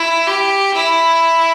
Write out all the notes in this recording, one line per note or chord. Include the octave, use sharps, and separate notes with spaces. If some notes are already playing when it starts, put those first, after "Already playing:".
Already playing: E4
G4
E4